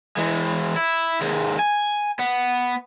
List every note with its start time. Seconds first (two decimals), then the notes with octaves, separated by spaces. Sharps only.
0.18 E3 G#3
0.76 E4
1.21 D#2 G#3
1.59 G#5
2.19 B3